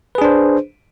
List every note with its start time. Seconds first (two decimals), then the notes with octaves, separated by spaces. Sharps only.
0.15 B4
0.18 G#4
0.22 D4
0.25 C5